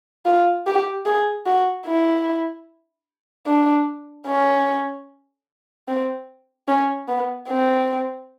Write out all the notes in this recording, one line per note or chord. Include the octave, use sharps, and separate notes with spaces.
F4
G4
G#4
F#4
E4
D4
C#4
C4
C#4
B3
C4